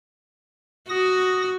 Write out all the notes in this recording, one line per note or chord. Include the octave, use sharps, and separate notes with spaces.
F#4 D#6 A#6